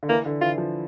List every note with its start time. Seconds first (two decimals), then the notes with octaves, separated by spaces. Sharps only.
0.03 D3
0.09 E3 A#3
0.26 D3
0.41 E3 F4
0.58 F3